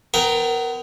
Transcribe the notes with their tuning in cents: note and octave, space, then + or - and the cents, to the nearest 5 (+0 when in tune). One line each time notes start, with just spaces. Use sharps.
B3 +35 A#4 +0 G5 +20